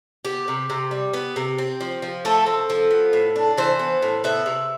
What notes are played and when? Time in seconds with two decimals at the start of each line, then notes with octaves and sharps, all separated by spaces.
0.25 B3 G4
0.48 C3
0.70 C3
0.91 G3
1.13 B3
1.36 C3
1.58 C4
1.81 F3
2.02 F3
2.25 A3 A4
2.46 C4
2.70 F3
2.91 B3
3.13 A2
3.36 D4
3.57 E3 C5
3.79 B3
4.02 A2
4.24 B3 E5
4.46 C3